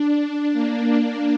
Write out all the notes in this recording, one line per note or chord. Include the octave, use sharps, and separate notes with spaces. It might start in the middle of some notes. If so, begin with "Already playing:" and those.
Already playing: D4
D4
A#3